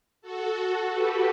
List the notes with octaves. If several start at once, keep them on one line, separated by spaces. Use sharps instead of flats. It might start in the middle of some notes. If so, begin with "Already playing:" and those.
F#4 A4
G4 B4